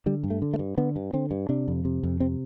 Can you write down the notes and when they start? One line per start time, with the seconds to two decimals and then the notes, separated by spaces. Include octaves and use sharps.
0.06 D3 G3
0.23 G2
0.30 A3
0.42 D3
0.54 A3
0.59 G2
0.77 D3 B3
0.96 G2
1.13 D3 C4
1.31 G2
1.49 C3 D4
1.68 F2
1.85 C3
2.03 F2
2.20 C3 C4